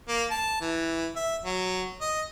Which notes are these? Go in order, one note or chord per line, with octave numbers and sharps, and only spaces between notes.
A#3
A5
E3
E5
F#3
D#5